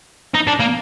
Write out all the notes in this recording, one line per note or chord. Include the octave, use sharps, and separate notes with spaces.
D#4
D4
A#3